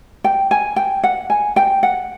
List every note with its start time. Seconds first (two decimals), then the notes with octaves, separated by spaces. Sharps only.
0.24 G5
0.51 G#5
0.76 G5
1.03 F#5
1.30 G#5
1.56 G5
1.83 F#5